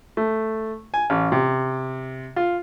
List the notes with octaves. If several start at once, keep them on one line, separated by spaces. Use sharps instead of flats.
A3
G#5
A1
C3
F4